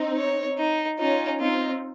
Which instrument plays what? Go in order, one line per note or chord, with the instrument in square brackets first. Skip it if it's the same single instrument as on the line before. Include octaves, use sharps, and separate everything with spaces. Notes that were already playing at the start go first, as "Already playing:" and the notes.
Already playing: [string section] C4 D#4
[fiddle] C#5
D#4
[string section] C#4 F4 [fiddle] D#4
[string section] C4 D#4 [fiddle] F4